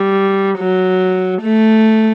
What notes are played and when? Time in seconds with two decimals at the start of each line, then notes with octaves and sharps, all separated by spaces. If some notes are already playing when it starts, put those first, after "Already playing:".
Already playing: G3
0.58 F#3
1.42 A3